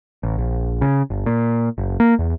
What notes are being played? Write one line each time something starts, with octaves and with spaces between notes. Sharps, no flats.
A1
A#1
C#3
G1
A#2
F#1
A#3
E2